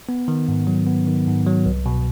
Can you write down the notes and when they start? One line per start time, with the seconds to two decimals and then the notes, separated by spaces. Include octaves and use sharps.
0.09 B3
0.28 D#3
0.48 G#2
0.67 F#3
0.87 B3
1.07 D#3
1.27 G#2
1.46 F#3
1.66 C2
1.86 B2